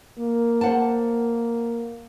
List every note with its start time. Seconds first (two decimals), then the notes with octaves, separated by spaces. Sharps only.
0.19 A#3
0.61 C5 F#5 A5